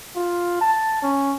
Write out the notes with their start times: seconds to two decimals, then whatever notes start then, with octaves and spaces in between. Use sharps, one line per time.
0.16 F4
0.61 A5
1.03 C#4